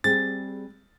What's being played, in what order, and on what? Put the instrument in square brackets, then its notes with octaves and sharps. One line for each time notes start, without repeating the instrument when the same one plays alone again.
[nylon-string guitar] G3 C4 G#4 [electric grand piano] A6